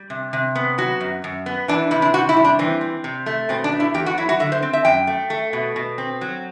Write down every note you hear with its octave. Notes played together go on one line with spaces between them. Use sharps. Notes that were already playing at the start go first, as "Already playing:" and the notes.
Already playing: G3
C3
C3
B3
F#3 F#4
F#2
F#2
B3
E3 D4
C3 E4
D4
C3 F#4
E4
G3
D4
E3 C4
C4
C3
A3
B2 C4
D4
A3
E4
E2 G4
F#4
F#3 E4
F#4
D3 E5
C5
C4
E5
F#2 G5
A3
A3
B2
B2
C4
F#3